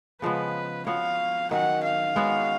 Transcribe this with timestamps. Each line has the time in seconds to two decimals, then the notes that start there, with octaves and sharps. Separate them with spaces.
0.22 C#3 F3 G#3 B3 B4
0.86 F3 B3 F#4 C#5 F5
1.51 D#3 F#3 C#4 F#4 F#5
1.83 F5
2.16 G#3 B3 F#4 C#5